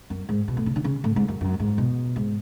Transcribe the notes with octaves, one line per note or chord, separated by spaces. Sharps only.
F#2
G#2
B2
A2
C#3
D3
C#3
A2
G#2
F#2
F#2
G#2
B2
G#2